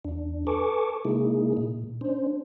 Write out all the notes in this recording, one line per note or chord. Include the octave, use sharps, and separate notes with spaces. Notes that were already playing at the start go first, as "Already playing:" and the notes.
E2 D4
A4 B4 G#5 A5 C#6 D6
C3 G#3 A#3 D#4 E4 G#4
A#2
C#4 D4 C5